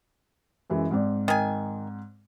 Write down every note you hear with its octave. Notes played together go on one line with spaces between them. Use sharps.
F#2 E3 G#3
G#2 C4 D5
D#3 G#5